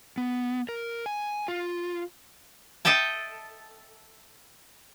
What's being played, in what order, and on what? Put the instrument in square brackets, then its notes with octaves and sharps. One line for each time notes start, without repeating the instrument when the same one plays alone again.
[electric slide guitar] B3
A#4
G#5
F4
[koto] A4 D#5 E5 G5 A5